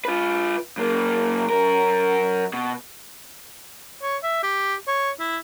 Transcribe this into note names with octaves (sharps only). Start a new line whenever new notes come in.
F4 B4
F#2 A#3
F#2 A#4
B2
C#5
E5
G4
C#5
E4